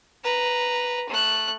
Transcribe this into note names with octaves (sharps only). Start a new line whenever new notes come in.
B4 A#5
A3 F#6